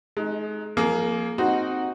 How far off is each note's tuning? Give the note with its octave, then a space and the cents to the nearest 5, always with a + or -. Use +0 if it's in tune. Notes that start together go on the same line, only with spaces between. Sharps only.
G#3 +35 D#4 +0
F3 +0 A#3 +0 G#4 +35
C4 +0 D#4 +0 F#4 +0